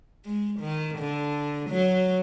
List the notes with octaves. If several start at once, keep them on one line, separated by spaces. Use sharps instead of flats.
G#3
D#3
D3
F#3